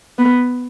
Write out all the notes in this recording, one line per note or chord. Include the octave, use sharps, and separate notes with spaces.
B3